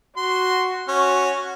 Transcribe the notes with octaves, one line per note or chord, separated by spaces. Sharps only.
F#4 C6
C#4 F#4